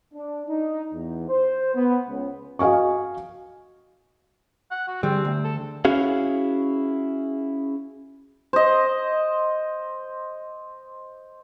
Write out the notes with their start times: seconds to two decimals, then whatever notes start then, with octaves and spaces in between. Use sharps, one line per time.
0.13 D4
0.48 D#4
0.93 E2
1.29 C5
1.75 B3
2.08 C#2
2.59 F#4 D#5 F5 G#5 C#6
4.71 F#5
4.88 F#4
5.03 D3 G3 C4 G#4
5.25 D2
5.44 A4
5.85 C#4 E4 F#4 G#4 F5
8.53 C5 D#5